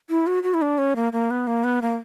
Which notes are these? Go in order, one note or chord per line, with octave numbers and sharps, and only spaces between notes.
E4
F#4
F#4
E4
D4
C#4
A#3
A#3
B3
A#3
B3
A#3